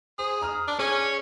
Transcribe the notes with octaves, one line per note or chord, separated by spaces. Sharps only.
G#4 C5
A#5 D#6 F6
D4
C#4 G#4 C#5